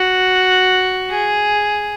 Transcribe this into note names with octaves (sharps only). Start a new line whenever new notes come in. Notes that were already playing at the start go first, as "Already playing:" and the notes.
Already playing: F#4
G#4